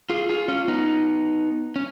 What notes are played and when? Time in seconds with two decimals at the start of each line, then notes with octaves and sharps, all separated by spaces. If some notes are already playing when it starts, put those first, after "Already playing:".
0.10 F4 G#4
0.29 F4 G#4
0.48 C#4 F4
0.68 B3 D#4
1.76 C#4